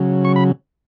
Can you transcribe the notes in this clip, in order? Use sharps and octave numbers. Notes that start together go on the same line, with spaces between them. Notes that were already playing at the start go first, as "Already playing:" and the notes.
Already playing: C#3 F#3
C#6
B5